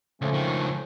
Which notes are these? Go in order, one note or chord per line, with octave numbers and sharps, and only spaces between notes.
C#2 F3 A3 C#4
C#2 D#3